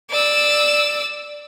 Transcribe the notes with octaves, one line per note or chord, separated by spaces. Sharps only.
D5 E6